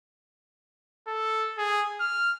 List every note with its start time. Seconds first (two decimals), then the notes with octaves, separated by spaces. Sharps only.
1.08 A4
1.58 G#4
2.00 F6